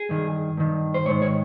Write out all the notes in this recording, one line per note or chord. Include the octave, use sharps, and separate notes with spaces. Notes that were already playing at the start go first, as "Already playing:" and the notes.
Already playing: G#4
G2 D#3
G2 D#3
C5
G#2 D#3 C#5
C#5